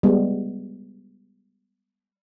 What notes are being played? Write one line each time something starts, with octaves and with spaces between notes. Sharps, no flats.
G3 G#3 B3